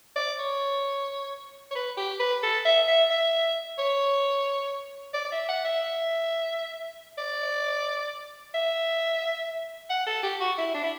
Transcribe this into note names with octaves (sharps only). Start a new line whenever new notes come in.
D5
C#5
C#5
B4
G4
B4
A4
E5
E5
E5
C#5
D5
D5
E5
F#5
E5
D5
E5
F#5
A4
G4
F#4
E4
D4
E4